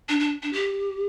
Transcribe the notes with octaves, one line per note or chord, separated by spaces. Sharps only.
D4
D4
D4
G4